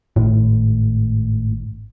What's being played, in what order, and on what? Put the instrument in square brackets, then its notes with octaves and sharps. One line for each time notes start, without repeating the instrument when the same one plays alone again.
[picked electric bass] G#1 [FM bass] A2